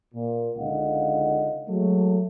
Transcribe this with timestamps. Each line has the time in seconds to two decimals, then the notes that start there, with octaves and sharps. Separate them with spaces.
0.14 A#2
0.56 C#2 D3 D#4 D#5 F5 F#5
1.68 F#3 G#3 A3